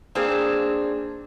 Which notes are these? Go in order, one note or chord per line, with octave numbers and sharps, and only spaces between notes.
A#3 C4 D4 G#4